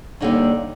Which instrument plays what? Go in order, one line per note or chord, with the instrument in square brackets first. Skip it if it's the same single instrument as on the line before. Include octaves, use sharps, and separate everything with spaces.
[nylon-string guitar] D#2 D3 G3 D#4